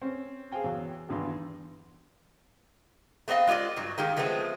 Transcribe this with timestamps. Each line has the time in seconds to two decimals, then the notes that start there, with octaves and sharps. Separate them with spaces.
0.02 C4 C#4 C5
0.52 G#4 C5 F5 G5 G#5
0.64 E2 F#3
1.09 G#1 E2 G2 E3 C6
3.28 A3 B3 C4 D#5 F5
3.47 G#3 F4 G4 D5 D#5
3.76 G2 F#3
3.98 D#3 G#3 A#3 G4
4.16 F3 G#3 A3 B3 C4